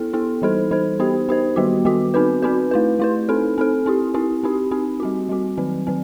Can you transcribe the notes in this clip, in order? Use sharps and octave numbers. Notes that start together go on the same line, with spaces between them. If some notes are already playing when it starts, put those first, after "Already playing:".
Already playing: B3 E4 A4
B3 E4 A4
E3 G3 D#4 A4 C5
E3 G3 D#4 A4 C5
B3 D#4 G4 C5
B3 D#4 G4 C5
D#3 G3 B3 F#4
D#3 G3 B3 F#4
C4 D#4 F#4 B4
C4 D#4 F#4 B4
A3 E4 B4
A3 E4 B4
C4 D#4 A4
C4 D#4 A4
C4 E4 G4
C4 E4 G4
C4 D#4 G4
C4 D#4 G4
G3 C4 F#4
G3 C4 F#4
D#3 F#3 C4
D#3 F#3 C4